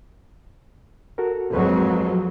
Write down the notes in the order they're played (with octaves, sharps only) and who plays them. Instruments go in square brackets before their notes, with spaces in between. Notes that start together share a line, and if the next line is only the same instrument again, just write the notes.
[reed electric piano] F#4 A4 A#4
[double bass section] F2 F#3 G#3 [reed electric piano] F#4 B4